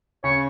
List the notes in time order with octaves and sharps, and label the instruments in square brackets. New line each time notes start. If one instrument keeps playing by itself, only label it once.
[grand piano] C#3 [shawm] C#5